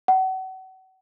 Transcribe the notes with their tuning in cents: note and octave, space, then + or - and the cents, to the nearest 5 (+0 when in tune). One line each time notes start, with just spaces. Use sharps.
F#5 +35